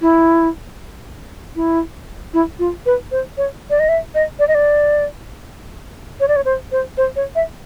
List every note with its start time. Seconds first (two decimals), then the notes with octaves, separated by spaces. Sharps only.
0.01 E4
1.56 E4
2.34 E4
2.59 F4
2.86 B4
3.11 C5
3.37 C#5
3.70 D5
3.80 D#5
3.89 E5
4.15 D#5
4.39 D5
4.48 D#5
4.55 D5
6.20 C#5
6.28 D5
6.36 C#5
6.45 C5
6.72 C5
6.97 C5
7.16 C#5
7.35 E5